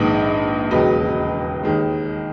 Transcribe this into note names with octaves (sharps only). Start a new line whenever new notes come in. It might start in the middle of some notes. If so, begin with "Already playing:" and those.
Already playing: A#1 G#2 D#3 G#3 B4 D#5
E1 D#2 C#3 F#3 B4 D#5
D#2 D#3 G#3